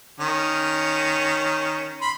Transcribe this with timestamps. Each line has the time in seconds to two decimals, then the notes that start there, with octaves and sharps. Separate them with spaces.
0.20 D#3 C#4
2.02 B5 C6